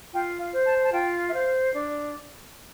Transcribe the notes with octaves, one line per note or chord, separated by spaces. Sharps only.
F4 G5
F5
C5
A5
A5
F4 G5
E5
C5 F5
D4